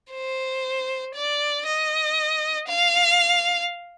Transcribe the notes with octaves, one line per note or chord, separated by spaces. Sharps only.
C5
D5
D#5
F5